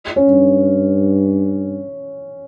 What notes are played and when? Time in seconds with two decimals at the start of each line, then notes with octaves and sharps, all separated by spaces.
0.16 C#4
0.28 G2